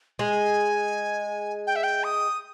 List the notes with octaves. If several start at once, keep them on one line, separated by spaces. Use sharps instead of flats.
G#3 G#5
G5
E5
G5
D#6